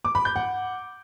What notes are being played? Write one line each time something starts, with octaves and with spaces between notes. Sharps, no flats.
D6
B5
G6
F#5